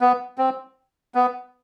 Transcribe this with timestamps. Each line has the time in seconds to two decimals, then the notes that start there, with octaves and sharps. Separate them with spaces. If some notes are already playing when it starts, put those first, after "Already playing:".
0.01 B3
0.38 C4
1.15 B3